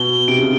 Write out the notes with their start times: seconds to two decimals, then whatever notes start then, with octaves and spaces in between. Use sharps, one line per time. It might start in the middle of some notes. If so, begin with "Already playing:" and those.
Already playing: B2 G7
0.28 C3 D7
0.41 C#3